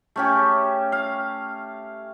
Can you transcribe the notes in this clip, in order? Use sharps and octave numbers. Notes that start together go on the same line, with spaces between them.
A3 C#4 G4
F5